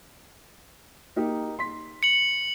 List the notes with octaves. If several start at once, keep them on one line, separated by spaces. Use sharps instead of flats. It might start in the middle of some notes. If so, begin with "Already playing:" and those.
A#3 D#4 G4
C6 B6
C#7 F#7